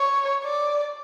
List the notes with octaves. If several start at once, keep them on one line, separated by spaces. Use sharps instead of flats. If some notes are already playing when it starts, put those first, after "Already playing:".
Already playing: C#5
D5